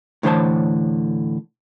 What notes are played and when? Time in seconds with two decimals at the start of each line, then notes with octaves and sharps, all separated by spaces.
0.23 A2 D3 E3 C5 C#5 A5